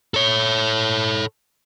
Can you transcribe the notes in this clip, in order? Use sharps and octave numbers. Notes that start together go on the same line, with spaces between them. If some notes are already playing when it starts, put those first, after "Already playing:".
A4 C#5